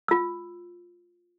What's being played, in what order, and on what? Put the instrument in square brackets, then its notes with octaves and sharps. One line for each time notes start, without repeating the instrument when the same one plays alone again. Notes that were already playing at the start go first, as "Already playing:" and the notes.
[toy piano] F4 E6